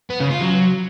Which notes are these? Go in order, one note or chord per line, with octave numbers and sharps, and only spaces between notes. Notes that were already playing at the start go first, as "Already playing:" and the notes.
B3
C#3
F4
F#3